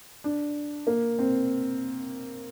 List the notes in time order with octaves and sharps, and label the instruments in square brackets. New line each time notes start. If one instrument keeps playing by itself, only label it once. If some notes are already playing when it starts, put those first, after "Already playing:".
[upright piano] D4
A#3
C4